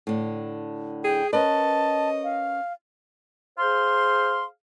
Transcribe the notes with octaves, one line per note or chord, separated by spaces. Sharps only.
A2 D3
G#4 G5
C#4 A#4 B4 D#5 A5
F5
G#4 C5 F5 C6